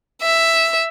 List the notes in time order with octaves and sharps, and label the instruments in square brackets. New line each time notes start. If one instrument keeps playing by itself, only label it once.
[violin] E5